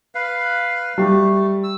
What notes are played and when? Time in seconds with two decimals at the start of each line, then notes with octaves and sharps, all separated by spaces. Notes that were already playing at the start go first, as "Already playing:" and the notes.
0.15 B4 F5
0.98 G3 A3
1.64 E6